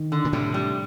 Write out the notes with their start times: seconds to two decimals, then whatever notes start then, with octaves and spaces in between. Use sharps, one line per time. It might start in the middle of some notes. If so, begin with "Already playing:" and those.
Already playing: D#3
0.12 D3
0.25 A#2
0.33 A2 C3 G3
0.54 G3